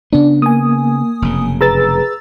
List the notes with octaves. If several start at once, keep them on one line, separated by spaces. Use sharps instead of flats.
C#3 B3 D4
A#3 G#5 D#6
F1 F#2 C#3
G#4 B4 A#5 E6 A6